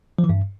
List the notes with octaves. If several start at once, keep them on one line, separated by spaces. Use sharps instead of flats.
F3
E3
G2